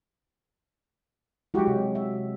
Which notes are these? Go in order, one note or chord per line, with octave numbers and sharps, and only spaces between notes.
F#3 G#3 E4 F#4 G4
C3
E5